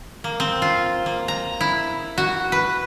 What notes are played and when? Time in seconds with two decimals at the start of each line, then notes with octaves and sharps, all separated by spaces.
0.24 A#3
0.40 C4
0.62 F4
1.06 A#3
1.28 A#5
1.61 E4
2.18 F#4
2.52 B4